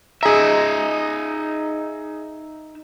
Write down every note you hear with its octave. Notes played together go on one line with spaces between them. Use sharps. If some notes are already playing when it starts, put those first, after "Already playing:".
D#4 G#4 E5 A#5